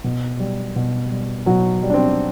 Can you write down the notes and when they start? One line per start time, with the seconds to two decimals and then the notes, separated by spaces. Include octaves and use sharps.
0.04 B2
0.40 G3
0.76 B2
1.11 G3
1.46 B2 F#3 F#4
1.83 G3
1.90 D4
1.94 C4